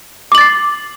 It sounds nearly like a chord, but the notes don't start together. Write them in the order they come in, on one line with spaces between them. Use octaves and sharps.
D6 F#7 A6 C7